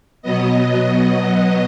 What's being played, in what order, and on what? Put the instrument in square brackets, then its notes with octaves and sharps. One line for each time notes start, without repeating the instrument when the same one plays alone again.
[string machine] B2 F#3 B3 D#5